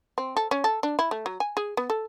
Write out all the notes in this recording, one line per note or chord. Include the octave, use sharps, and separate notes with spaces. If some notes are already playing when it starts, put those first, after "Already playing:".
C4
A4
C#4
A4
D4
E4
A3
F#3
G#5
G#4
B3
A4